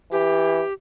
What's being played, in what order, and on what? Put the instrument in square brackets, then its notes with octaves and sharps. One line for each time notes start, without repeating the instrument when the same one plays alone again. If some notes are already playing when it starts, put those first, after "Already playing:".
[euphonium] E3 [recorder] G4